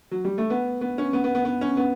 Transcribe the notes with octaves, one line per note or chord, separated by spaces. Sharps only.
F#3
G3
A3
B3
B3
C#4
B3
B3
B3
B3
C#4
B3